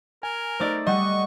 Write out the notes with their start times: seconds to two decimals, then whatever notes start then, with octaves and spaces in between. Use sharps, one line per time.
0.23 A#4 G#5
0.60 A3 D#4 C5 D5
0.87 G3 D#5 F#5 C#6